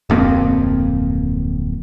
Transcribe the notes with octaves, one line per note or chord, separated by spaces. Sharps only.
D1 F2 A#3 C4